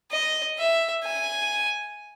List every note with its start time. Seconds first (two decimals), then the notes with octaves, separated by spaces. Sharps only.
0.11 D#5
0.58 E5
1.04 G#5